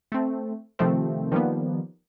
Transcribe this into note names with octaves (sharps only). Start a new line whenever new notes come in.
A3 C4
C3 D#3 F3 A3 C4
D#3 F3 G3 A#3 B3